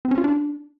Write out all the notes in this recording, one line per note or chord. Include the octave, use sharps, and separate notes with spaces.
C4
C#4
F4
D4